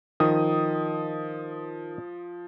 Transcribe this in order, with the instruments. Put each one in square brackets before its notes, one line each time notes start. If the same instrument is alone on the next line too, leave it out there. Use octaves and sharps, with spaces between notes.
[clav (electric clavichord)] D#3 [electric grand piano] F3 D#6